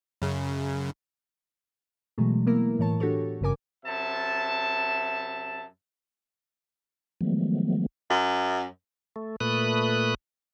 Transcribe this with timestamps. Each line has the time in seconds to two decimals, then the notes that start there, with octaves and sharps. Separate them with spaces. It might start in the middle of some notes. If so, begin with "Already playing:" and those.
0.22 F#2 C#3
2.18 B2 E3 F#3 G#3 A3
2.47 A#3 B3 E4 A#4
2.79 A2 E3 C#5 A5
3.00 D4 F#4 G4 A4 C#5
3.41 G#1 G2 C#3 A#4 G#5 D6
3.86 F#2 C3 E5 A5
7.21 D#3 F3 F#3 G#3 A3 B3
8.10 F#2
9.16 A3
9.40 A#2 A3 B4 D#6 F#6